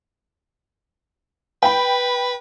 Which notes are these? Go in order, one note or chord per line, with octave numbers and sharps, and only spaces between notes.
B4 G5 B5